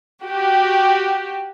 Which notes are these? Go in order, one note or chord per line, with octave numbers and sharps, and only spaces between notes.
F#4 G4